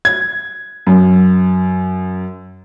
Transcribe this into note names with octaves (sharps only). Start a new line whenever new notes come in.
G#6
F#2